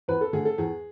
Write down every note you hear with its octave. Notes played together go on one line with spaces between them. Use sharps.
E2 B4
A4
D3 A3 G#4
A4
E2 G#4